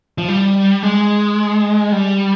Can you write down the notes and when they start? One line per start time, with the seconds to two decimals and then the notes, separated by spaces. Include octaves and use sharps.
0.18 F3
0.29 G3
0.83 G#3
1.92 G3